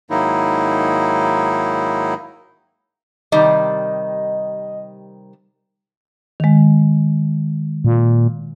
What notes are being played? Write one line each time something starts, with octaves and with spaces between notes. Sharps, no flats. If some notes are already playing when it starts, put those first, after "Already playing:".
G#2 D#3 F#3 A#3 D#4 E4
C3 D#3 G3 D#5
D#3 G#3
A#2